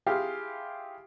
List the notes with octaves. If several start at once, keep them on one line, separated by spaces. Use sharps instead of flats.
E4 F4 G4 G#4 F5